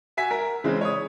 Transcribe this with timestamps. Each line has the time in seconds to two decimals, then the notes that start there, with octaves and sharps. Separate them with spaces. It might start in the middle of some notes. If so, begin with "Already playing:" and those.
0.17 F#4 E5 G#5 B6
0.31 A#4
0.64 C#3 E3 G#3 C4
0.81 C#5 D#6